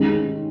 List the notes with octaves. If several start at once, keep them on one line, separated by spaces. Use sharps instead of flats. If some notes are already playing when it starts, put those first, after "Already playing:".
Already playing: D#3 G#3 C#4